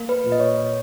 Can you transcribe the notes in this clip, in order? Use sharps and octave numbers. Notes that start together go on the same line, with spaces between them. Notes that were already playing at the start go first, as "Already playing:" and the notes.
Already playing: A#3
B4
A#2
D#5
C#5